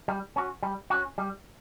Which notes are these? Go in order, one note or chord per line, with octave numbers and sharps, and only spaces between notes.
G3
C#4 F#4
G3
C#4 F#4
G3